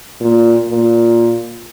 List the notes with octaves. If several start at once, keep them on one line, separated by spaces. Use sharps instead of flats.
A#2
A#2